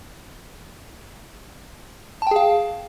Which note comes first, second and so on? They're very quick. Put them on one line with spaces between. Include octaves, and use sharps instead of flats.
A5 G5 G#4 F5